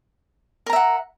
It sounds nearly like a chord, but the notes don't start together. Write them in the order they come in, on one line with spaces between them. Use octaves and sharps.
A#4 A#5 E5 F#5